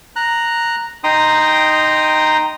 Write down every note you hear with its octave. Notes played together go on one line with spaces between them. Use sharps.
A#5 F#6
D#4 G5 A#5 C6 D#6